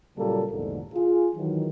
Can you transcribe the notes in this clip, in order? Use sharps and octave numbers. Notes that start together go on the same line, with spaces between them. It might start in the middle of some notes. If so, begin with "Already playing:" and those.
A#2 C#3 F#3 G3 A#3 A4
A#1 E2 G#2 D3
F4 G#4
D#3 E3 F#3